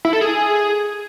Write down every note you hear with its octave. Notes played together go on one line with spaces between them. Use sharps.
E4
A4
G#4